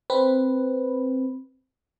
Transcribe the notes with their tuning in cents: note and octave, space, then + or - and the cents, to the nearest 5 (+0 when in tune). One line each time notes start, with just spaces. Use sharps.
C4 +0 B4 +0